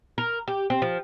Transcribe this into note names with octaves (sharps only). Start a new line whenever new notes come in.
A#4
G4
C4
F3